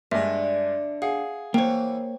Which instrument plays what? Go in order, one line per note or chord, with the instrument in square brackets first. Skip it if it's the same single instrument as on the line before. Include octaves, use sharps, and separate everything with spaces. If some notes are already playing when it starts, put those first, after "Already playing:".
[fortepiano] G2 G#3 [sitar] D3 D4 [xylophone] E5
[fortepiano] G#4 [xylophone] F5 F#5
[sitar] E3 B3 [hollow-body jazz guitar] A#3 C#5 [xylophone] C5 G5